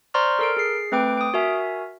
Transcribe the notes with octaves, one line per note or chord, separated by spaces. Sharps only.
C5 D5 A#5 C6 C#6 F6
A4 A#4 D7
G#4 C7
A3 C4 B4 G5 D6 D7
D#6 D7
F#4 A#4 E5 G#5